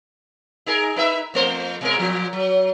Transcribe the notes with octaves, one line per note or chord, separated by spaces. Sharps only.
D#4 G#4 A#4
D#4 B4 E5
F2 A3 C5
B2 G#3 A#4
A#2 F3
F#3